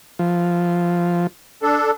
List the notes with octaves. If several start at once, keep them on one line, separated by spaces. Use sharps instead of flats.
F3
D4 A4